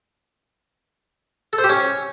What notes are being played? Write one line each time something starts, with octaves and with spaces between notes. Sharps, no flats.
A4
C5
G4
C#4